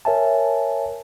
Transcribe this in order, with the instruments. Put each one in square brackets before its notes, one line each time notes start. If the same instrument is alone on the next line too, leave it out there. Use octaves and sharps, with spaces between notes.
[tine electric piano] A#4 C#5 E5 G#5 A5